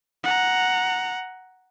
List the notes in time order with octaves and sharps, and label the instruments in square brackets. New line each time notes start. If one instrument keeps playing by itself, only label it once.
[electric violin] F#5 A#5